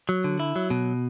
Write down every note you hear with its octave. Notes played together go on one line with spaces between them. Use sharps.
F#3
D3
E4
F#3
B2